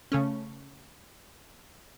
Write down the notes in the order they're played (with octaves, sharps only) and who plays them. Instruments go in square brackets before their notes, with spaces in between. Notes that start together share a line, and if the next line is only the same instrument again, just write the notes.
[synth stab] C#3 A3 C#4